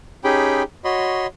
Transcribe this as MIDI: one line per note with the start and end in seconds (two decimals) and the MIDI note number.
0.24 0.63 61
0.24 0.63 63
0.24 0.63 67
0.24 0.63 68
0.24 0.63 79
0.24 0.63 83
0.84 1.27 66
0.84 1.27 73
0.84 1.27 75
0.84 1.27 83
0.84 1.27 84